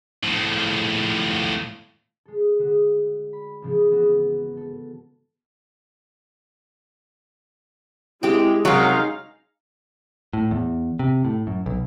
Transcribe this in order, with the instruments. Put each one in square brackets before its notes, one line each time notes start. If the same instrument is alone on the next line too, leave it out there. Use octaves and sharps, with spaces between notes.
[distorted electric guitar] A2 F3
[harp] G#3 A4
D3 G#3 F#4
B5
G#1 C#3 E3 F3 G#3
G#3 B3 F#4
A4
[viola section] G#3 [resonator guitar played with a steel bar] C4 G4 [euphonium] E4
[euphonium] F#2 [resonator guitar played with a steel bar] C3 F#3 [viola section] D#4 G#4 F5
[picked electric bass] A2
E2
C3
A2
F#2
B1